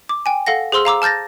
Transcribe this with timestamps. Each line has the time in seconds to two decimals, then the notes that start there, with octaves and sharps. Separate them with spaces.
0.09 D6
0.26 G5 G#5
0.47 A4 F5 F#5 A#6
0.72 G#4 C5 C6 E6 F6
0.85 F5 A#5 D6 E6
1.02 A5 F6 G6 A6 A#6